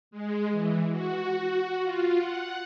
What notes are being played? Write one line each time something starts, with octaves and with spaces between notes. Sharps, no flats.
G#3
E3
F#4
F4
F#5